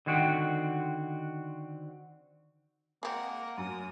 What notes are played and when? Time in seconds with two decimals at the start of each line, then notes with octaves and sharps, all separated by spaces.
0.06 D3 D#3 C4 F#4 F#5 G5
3.03 G#3 A#3 C4 A#4 F#5
3.58 F#2 D#6